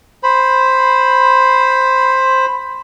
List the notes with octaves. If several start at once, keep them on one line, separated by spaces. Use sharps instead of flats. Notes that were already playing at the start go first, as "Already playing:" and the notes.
C5 B5